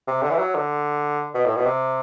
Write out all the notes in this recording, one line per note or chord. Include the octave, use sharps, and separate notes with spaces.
C3
D3
E3
F#3
D3
B2
A2
B2
C3